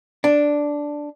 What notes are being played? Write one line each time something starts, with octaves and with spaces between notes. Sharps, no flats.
D4